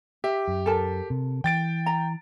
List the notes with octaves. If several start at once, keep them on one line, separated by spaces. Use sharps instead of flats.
G4 E5
F#2
A4 A#4 A5
C3
E3 G5 A6 D7
A#5